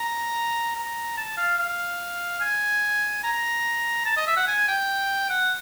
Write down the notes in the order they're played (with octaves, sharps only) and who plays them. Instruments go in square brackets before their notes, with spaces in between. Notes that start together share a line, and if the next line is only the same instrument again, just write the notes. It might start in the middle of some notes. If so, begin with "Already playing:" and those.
Already playing: [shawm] A#5
A#5
A5
F5
F5
G#5
A#5
A5
D#5
E5
F#5
G#5
G5
F#5